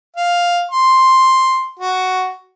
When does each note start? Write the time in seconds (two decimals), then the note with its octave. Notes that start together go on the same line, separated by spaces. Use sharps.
0.16 F5
0.71 C6
1.79 F#4